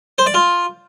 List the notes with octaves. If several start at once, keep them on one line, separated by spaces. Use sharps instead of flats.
C5
D5
F4